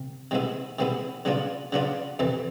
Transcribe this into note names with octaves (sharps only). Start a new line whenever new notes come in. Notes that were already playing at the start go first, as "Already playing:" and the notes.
Already playing: C2 C3
C3 D#3 G#3 B3 E4
C3 D#3 G#3 B3 E4
C#3 F#3 B3 D4 F4
C#3 F#3 B3 D4 F4
F2 C3 E3